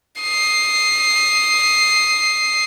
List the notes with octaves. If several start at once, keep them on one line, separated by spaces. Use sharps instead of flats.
D#6 C7